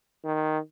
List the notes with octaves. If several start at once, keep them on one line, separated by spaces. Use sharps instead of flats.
D#3